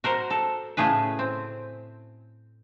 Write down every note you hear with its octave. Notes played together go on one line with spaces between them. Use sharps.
F#4 A#4 C5
A4
A2 C#3 A3 G#4 B4
C4